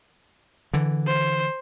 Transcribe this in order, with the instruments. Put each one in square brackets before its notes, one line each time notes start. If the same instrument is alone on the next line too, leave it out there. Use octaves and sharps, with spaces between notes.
[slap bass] D3 E3
[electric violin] C5